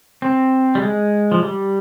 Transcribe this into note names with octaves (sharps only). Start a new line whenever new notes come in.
C4
G3
G#3
F3
G3